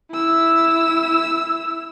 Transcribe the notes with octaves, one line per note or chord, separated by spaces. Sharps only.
E4 E6